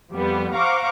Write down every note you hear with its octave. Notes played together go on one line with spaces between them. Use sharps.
F2 G3 B3
C5 F5 F#5 A#5 C#6 D6